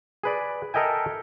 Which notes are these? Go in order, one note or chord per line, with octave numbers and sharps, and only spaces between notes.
G#4 B4 D5
A4 A#4 D#5 E5 G5 G#5